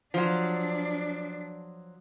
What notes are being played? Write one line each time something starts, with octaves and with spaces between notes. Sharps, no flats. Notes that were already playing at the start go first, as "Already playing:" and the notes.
F3 F#3 D4